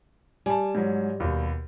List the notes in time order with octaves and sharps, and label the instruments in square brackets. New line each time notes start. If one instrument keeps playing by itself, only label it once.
[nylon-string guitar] G3 [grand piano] G#5 A5
[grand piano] G#2 F#3
D#2 B2